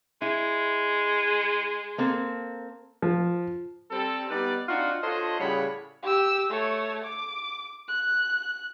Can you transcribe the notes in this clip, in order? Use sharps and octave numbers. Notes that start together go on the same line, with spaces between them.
G#3 E4
A#3 C4 A4
F3
G3 C4 A4
G3 B3 D#4 B4 D5
C4 D4 D#4 F4 F#4
D4 F4 A4 C5 C#5 D#5
A2 C#3 G3 C#5 F#5 B5
G4 E6
A3 C#5
D6
F#6